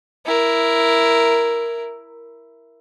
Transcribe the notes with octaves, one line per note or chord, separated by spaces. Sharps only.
E4 A#4